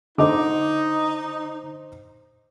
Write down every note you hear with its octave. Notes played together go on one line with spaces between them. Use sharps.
D3 D#4 C5 D#5 D6